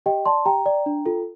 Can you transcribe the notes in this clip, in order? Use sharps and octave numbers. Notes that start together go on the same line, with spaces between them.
G4 D#5 G5
D5 A5 C6
G4 G5 A#5
D5
D4
F4 A4